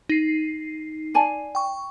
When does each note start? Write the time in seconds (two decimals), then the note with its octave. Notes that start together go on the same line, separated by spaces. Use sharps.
0.09 D#4 C7
1.14 D5 G#5 A5
1.55 G5 C#6